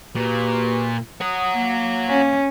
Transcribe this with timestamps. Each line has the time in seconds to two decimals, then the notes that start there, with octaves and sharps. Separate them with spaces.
0.15 A#2 F#4 G4 B4
1.21 C#5 F#5 D#6
1.54 A#3
2.09 C#4